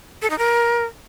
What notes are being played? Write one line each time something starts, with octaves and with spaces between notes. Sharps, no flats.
A4
D#4
A#4